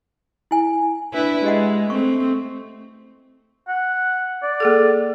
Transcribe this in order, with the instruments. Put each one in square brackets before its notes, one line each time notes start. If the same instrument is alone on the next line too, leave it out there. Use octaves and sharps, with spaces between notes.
[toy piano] E4 G#5
[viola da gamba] D4 E4 B4
[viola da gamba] G#3 [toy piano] G4 D#5 F#5
[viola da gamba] A3 C4 [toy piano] C#6
[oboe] F#5
D5
[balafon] A#3 G#4 A4